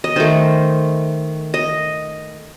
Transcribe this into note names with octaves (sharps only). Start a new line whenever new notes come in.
D#5
D#3 A3 C5
D#5